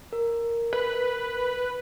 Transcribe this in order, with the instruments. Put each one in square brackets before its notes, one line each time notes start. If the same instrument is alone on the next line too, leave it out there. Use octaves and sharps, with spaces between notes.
[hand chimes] A#4
[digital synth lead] B4